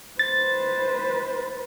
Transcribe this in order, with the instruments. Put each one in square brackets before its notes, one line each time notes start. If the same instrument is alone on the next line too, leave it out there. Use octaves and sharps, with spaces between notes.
[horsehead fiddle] B4 C5 [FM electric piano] A6